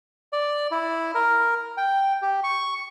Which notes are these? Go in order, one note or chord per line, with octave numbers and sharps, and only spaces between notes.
D5
E4
A#4
G5
G4
C#6